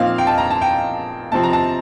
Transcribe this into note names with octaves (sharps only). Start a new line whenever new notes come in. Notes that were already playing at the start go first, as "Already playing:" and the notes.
Already playing: A#2 F3 C4 D#4 F5
G5
A5
A#5
A5
G5
C3 F3 C4 A5
A#5
A5